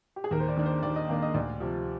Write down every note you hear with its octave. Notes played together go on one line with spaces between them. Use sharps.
G4
G#4
D#2 A#4
C5
D5
D#3 A#3 D4
C5
D#2 D5
D#5
D#3 A#3 D4 F5
D#5
D2 D5
C3 F3